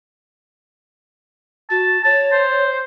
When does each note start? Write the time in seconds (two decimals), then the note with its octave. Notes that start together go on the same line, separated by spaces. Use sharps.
1.70 F#4 A5
2.04 C#5 A5
2.32 C5